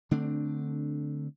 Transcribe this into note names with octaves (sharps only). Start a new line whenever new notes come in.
D3 A3 C4 D4